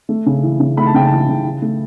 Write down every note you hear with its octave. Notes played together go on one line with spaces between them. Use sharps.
A3
C#3
E3
C#3
A3 B5
A5
C#3 G5
A5
E3
C#3
E3
A3